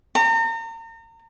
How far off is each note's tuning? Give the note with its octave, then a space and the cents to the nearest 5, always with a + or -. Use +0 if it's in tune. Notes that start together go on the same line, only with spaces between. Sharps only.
A#5 -40